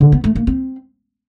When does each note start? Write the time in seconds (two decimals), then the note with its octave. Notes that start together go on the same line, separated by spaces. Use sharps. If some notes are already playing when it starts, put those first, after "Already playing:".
0.01 D3
0.12 B3
0.24 A3
0.35 A#3
0.47 C4